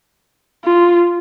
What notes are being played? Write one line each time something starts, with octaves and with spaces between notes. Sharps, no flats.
F4